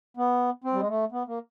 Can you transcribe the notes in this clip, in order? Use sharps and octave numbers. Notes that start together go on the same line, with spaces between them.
B3
C4
G3
G#3
A3
B3
A#3